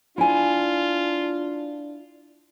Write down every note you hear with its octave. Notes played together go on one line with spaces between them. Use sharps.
D4 E4 F4 G#5